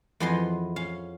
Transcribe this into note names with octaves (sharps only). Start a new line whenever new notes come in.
F2 E3 B3 G#4 D#5 C6
C#4 F5